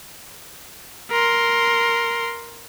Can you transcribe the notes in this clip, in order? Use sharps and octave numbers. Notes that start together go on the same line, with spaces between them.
A#4 C6